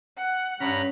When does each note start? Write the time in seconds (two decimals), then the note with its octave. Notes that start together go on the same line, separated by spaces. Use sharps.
0.17 F#5
0.60 G2 C#4 A#5 B5